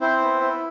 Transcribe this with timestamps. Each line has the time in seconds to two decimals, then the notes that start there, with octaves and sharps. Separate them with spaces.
0.01 C4 E4 C5
0.22 B3
0.42 E4